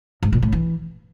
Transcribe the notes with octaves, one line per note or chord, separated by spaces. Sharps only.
G#2
A#2
A2
E3